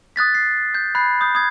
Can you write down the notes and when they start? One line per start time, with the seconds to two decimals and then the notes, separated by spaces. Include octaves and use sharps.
0.16 D#6 F#6 A6 B6
0.35 C7
0.74 G6
0.95 B5 F#6 G#6 C7
1.21 D#6 G6
1.35 D#6 G#6